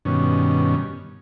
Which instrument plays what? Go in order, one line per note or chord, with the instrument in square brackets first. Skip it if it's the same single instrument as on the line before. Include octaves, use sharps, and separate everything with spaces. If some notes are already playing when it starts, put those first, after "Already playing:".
[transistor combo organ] G2 B2 D#3 C#4